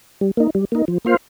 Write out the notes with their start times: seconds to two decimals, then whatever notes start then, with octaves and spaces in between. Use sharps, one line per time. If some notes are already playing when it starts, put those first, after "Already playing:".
0.21 G3
0.37 A#3 D#4
0.55 G3
0.72 A#3 D#4
0.88 F3
1.05 A#3 F4 C5 F5